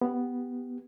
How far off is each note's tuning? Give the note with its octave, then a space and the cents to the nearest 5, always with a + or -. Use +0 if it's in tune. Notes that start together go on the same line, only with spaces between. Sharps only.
B3 +0 G4 +0